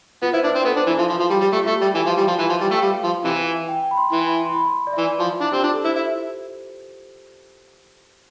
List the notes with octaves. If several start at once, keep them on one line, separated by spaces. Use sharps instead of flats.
B3 F4
E4 C5
D4 B4
C4
B3 A4
D4 C5
E3 E4
F3 E4
F3 F4
F3
G3
G3
A3 G4
A3 F4
G4
G3
E3
F3
G3
F3
E3 B4
F3
G3
A3 G5
G3 F5
F3
C3 E3
G5
B5
C6
E3 C6
C6
B5
C6
D5
E5
E3 D5
F3
D4 E4
C4 G4
D4 F4
A4
E4 C5
E4